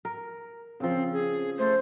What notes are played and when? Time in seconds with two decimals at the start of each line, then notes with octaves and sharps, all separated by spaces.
0.05 A#4
0.80 C#3 F3 C4
1.13 G#4
1.58 A3 C5